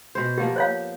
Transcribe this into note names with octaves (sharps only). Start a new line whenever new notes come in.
B2 C5
F3 A#3 B3 G4
C5 C#5 F5